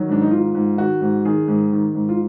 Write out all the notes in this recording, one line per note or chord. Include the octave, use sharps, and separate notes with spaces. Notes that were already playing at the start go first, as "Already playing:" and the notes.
Already playing: D#3 F#3
G#2 D4
D#4
D#3 F4
G#2
D#3 F#4
G#2
D#3 G#4
G#2
D#3
G#2
F4